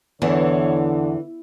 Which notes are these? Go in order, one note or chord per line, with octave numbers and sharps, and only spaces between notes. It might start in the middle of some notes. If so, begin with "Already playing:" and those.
E2 D3 E3 C#5